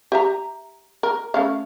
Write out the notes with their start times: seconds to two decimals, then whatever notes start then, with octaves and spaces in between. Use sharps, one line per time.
0.12 G4 E5 A#5
1.03 A#4
1.34 A3 C#4 F5